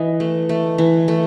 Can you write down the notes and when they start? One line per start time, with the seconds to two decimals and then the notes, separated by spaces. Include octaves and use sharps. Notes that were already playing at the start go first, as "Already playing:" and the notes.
Already playing: E3 D#5
0.20 A3
0.49 A3
0.78 E3
1.08 A3